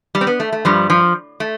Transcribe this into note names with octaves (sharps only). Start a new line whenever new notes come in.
G3
C4
B3
A3
A3
G2 F3 G3
F3
A3